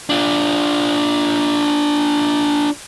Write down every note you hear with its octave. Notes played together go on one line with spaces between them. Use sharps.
D4 F4